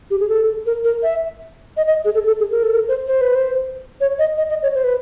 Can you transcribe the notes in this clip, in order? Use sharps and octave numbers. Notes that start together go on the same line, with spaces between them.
G4
G#4
A4
A#4
A#4
E5
D#5
D#5
G#4
A4
A4
G#4
A#4
A4
A#4
C5
C5
B4
C5
C#5
D#5
D#5
D#5
C#5
C5
B4